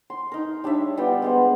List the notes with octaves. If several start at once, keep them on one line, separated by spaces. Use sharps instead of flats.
C6
D#4 A#4
G3 D4 C#5 E5
G3 B3 F4 G5
G#3 B3 C5